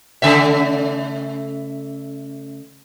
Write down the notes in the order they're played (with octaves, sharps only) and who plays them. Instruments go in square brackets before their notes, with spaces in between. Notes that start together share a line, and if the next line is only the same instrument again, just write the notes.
[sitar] C#3 A3 E5